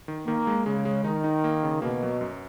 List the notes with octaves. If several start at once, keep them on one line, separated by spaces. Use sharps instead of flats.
D#3
D#3 A#3
G#3
C#3 G#3
G#3
D#3 D#4
D#4
A#3
C#3
B2 A#3
F#3
F#2